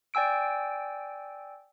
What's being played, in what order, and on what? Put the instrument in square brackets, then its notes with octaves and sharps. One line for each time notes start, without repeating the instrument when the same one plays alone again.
[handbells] D5 G5 G#5 E6 D7